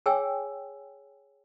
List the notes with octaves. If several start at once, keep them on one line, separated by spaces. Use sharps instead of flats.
G#4 C#5 G5 G#5 E6